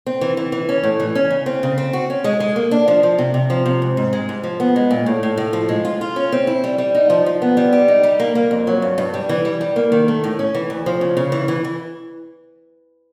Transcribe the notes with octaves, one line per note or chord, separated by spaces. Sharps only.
C4
E3
E3
E3
C#4
A2
E3
C#4
C#3
C4
C#3
C4
F#4
C#4
G#3
G#3
A#3
D4
F3
F3
C3
C3
F3
C3
G#2
G#2
G#3
G#2
F3
B3
G#3
A#2
A2
A2
A2
F3
G#3
F4
F4
C#4
C4
E4
G3
G3
D#4
F3
F3
B3
G3
G4
D#4
G3
A#3
A#3
F2
F#3
G2
G2
G3
E3
G3
G3
A#3
D#3
A3
A2
C#4
E3
D2
F3
C#3
C#3
E3
E3
E3